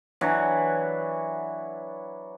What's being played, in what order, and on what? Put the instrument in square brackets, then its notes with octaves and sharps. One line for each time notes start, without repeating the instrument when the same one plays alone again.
[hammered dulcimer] E3 F#3 D4 C#5